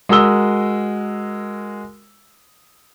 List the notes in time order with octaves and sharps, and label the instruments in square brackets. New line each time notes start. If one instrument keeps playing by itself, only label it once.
[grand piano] G#3 F#4 A#4 D#6 E6 G7